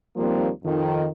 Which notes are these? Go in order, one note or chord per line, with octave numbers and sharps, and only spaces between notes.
D#2 F3 G3 A#3 C4
F2 D#3